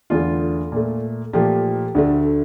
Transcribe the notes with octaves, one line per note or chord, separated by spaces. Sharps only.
E2 D3 A3 F4
A#2 A3
A#2 F3 A3 G4
D2 D3 A3